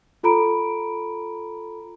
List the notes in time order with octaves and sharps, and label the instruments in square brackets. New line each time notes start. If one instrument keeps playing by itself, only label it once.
[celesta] F4 A4 A#5 B5 D7